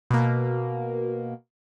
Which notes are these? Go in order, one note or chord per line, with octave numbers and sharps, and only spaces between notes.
B2 A#3